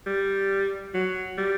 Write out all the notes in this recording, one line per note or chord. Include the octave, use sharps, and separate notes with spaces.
G3
F#3
G3